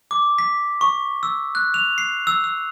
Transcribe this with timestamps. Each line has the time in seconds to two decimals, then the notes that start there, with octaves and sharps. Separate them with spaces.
0.11 D6
0.38 B6
0.81 C#6
1.23 E6
1.55 F#6
1.74 F7
1.98 C7
2.27 E6
2.44 E6